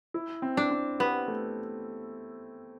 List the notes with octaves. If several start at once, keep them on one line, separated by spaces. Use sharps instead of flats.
E4
C4
D4
C4
B3 G4
A3